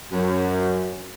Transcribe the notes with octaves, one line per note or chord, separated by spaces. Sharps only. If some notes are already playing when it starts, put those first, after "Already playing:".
F#2